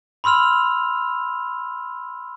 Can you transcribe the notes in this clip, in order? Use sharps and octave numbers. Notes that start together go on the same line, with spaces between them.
B5 C6 E6 F6 F7